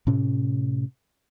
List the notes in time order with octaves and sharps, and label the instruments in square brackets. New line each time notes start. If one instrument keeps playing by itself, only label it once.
[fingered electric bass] A2 C3 C#4